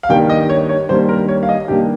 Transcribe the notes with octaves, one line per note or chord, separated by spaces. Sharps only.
F5
G2 D#3 G3 A#3 G5
D#5
C#5
C#5
G2 D#3 G3 A#3 C5
A#4
C#5
F5
D#5
G2 D#3 G3 A#3 G4